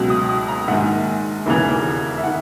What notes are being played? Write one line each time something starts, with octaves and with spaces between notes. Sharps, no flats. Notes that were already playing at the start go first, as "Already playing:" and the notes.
Already playing: C#2 B2 F#3
D#6
D#6
A#5
A#1 G#2 D#3 F#5
E1 D#2 C#3 E3
E5
D#3 F#5